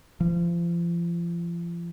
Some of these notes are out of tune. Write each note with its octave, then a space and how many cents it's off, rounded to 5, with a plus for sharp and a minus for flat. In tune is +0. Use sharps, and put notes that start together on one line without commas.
F3 -35